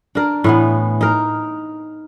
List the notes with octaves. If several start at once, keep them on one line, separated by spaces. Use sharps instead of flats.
D4 A#4
A2 E3 B3
D#4 A#4